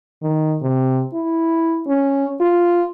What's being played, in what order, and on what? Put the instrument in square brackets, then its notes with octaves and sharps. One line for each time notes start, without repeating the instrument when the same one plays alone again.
[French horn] D#3
C3
E4
C#4
F4